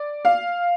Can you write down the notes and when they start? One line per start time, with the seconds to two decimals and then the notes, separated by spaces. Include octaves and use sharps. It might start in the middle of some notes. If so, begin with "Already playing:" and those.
Already playing: D5
0.25 F5